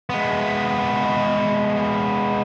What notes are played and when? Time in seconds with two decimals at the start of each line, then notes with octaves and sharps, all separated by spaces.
0.10 G#3 B3